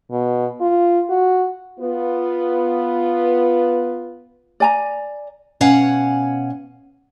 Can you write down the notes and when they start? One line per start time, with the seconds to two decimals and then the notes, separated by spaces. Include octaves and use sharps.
0.11 B2
0.61 F4
1.09 F#4
1.79 B3 F4 B4
4.60 D5 G#5 A#5
5.61 B2 C#4 C#5 F5 F#5 G#5